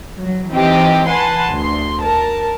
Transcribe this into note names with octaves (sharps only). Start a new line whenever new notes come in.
F#3
E3 C4 D#4 G4 C5 D#5
B4 F#5 G#5 A5 C6
D2 C6
A#4 A5